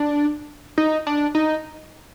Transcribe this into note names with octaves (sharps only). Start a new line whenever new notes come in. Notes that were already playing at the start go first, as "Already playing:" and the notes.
Already playing: D4
D#4
D4
D#4